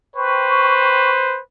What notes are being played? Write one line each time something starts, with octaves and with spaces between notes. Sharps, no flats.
B4 C5 G5 C#6